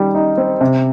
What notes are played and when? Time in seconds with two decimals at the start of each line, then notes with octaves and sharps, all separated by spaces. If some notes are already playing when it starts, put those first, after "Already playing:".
Already playing: D#3 G3
0.15 D#4
0.38 C4
0.61 C3